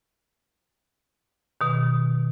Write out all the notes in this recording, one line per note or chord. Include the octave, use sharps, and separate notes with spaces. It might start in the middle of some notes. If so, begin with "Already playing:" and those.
B2 D#3